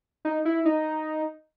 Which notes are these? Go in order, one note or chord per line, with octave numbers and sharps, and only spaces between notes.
D#4
E4
D#4